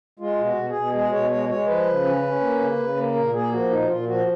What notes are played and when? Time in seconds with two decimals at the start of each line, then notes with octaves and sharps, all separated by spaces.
0.19 G#3 F4
0.38 B2
0.44 F#4
0.56 B2
0.69 G#4
0.75 B2
0.94 G#3 G#4
1.12 B2 C#5
1.30 G#3 C#5
1.49 G#3 C#5
1.67 F3 B4
1.86 C#3
2.04 C#4
2.23 C#4
2.41 A#3
2.60 C#3
2.78 C#3
2.96 A#3
3.14 A#2 A#4
3.33 A#3 G#4
3.51 F3 F#4
3.70 A#2 D#4
3.84 F#4
3.88 A#2 F4
4.07 F3 F#4